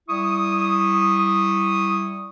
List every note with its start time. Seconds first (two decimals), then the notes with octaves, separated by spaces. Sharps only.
0.09 G3 E4 C#6 D#6